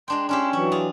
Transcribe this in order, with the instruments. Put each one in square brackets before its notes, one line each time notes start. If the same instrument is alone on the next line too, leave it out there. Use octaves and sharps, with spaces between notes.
[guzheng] G#3 D4 G5 [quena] C6
[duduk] C#4 [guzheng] D4 E4 G4 [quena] C6
[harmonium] E3 F#3 [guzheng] E4 [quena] C#6
[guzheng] F4 G#4